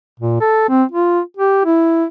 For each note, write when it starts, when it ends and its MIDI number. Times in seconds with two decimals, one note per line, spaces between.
0.20 0.37 46
0.41 0.64 69
0.69 0.84 60
0.92 1.20 65
1.37 1.63 67
1.65 2.04 64